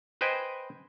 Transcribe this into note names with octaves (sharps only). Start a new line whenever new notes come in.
B4 C5 D#5 G5 G#5